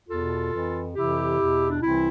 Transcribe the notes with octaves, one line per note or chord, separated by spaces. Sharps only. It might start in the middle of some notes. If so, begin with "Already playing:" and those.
E2 B2 F4 A4
F2 E3
F2 C3 E3 E4 G4
E2 B2
D4
C2 C3 E3 C4 E4